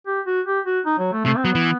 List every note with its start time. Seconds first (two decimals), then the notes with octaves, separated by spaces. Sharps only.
0.07 G4
0.27 F#4
0.47 G4
0.66 F#4
0.86 D#4
0.99 F#3
1.12 A3
1.25 C3 A3
1.37 C4
1.45 F#3 B3
1.55 E3